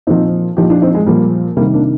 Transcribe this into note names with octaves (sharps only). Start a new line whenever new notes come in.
A#2 F3 C4 D#4
A#2 F3 D#4 G4
D4 F4
C4 D#4
G#3
A#2 F3 G3 A#3
C3 D#3 G3 A#3
A#3 D4